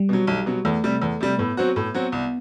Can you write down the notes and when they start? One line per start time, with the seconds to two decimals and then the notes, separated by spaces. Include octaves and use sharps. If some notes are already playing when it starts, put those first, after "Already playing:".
Already playing: G3
0.09 B2 F#3
0.27 B1
0.46 B2 F#3
0.65 E2 A3
0.84 C3 G3
1.02 E2
1.21 C3 G3
1.39 A2 B3
1.57 F#3 C4 F#4
1.76 A2
1.94 F#3 C4 F#4
2.12 C2